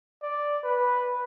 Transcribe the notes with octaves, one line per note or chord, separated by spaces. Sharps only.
D5
B4